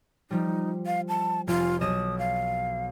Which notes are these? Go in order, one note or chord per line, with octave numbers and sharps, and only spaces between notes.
F3 G3 D#4
F5
A5
F1 F4
B1 D#5 D#6 E7
F5